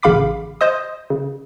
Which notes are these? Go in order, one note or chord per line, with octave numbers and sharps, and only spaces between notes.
A1 C#3 F5 B5 D6 B6
C5 D#5 D#6
C#3